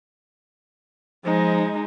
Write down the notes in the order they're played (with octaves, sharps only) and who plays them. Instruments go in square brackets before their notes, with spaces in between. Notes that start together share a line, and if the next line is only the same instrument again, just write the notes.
[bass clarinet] F3 [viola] G#3 [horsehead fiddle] D#4